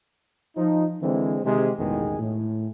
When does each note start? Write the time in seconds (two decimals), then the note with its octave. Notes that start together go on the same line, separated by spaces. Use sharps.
0.57 F3 D#4
1.02 D3 E3 G#3 C4
1.44 C3 D#3 G#3 C4 G4 G#4
1.79 A1 E2 B2 D#3 G#3 G#4
2.19 A2